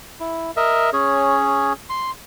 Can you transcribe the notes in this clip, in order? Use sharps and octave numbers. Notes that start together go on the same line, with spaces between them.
E4
A#4 D#5 E5
C#4 G#4 C#5
C6